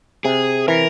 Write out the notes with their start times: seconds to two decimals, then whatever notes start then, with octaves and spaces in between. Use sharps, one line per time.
0.24 C3 G#4
0.68 E3 A#4